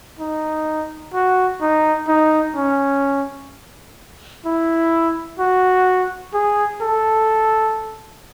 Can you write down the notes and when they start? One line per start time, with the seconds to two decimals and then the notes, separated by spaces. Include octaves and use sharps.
0.19 D#4
1.14 F#4
1.61 D#4
2.08 D#4
2.56 C#4
4.45 E4
5.39 F#4
6.34 G#4
6.81 A4